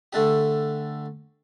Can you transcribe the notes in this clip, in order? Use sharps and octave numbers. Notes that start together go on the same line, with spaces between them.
D3 A3 D4 G4